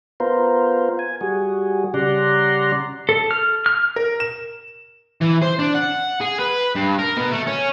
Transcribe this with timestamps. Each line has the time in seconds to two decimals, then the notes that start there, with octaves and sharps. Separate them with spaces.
0.20 B3 F4 A#4 C5
0.99 G#5
1.21 G3 F#4 G#4
1.94 C#3 G3 D5 F#5 A#5 C6
3.09 A4
3.31 F6
3.66 F6
3.96 A#4
4.20 E7
5.21 E3
5.42 C5
5.59 D4
5.75 F#5
6.21 G#4
6.40 B4
6.76 G2
6.99 A#4
7.17 B2
7.31 A3
7.47 C#4